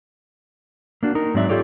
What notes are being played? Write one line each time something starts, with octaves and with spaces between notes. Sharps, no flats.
A#3 D4 F#4
D#4 A#4
G#2 F#3 C4 D5 E5
F4 G4 A4 C#5 D5